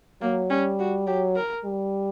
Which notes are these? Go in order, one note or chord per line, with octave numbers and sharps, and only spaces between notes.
F#3 A#3
G3 C#4
F#4
F#3 G4
A#4
G3